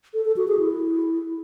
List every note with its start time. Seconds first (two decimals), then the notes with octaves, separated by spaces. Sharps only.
0.14 A4
0.25 A4
0.37 F#4
0.48 G#4
0.59 E4